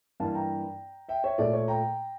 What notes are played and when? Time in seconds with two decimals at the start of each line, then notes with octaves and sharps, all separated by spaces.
0.20 G2 E3 A#3 F5 A5
0.35 G5 A#5
1.08 E5 G5
1.24 C#5 E5
1.38 A#2 A3 D5
1.53 C#5
1.68 G5 A#5